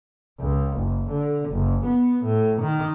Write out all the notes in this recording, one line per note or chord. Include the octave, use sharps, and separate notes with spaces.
C#2
F#1
D3
F#1
B3
A2
D#3